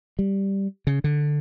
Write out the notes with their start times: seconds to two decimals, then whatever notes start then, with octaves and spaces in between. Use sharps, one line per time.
0.19 G3
0.87 C#3
1.04 D3